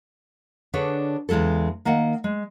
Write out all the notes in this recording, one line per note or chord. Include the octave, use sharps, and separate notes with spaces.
D3 D4 G#4 B4 C#5
E2 C#3 G#3 E4 A4
D#3 A#3 D#5 F#5
G#3